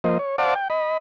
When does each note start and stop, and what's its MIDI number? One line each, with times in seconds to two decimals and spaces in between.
0.04 0.18 53
0.04 0.18 58
0.04 0.18 72
0.04 0.18 75
0.19 0.36 73
0.38 0.54 72
0.38 0.54 74
0.38 0.54 77
0.38 0.54 78
0.38 0.54 81
0.38 0.54 86
0.55 0.68 79
0.70 0.97 75
0.70 0.97 83